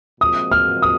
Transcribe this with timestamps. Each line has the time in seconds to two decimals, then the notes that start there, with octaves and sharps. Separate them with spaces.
0.21 A#2 F3 G#3 C4 F#4 D#6
0.52 F6
0.82 D#6